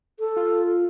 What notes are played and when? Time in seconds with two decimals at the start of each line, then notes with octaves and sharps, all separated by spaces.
0.19 A4
0.37 F4